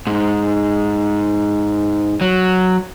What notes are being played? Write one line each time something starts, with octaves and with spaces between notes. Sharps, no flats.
G#2
F#3